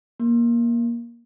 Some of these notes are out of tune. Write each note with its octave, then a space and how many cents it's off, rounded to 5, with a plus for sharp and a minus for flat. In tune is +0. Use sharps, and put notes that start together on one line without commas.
A#3 +15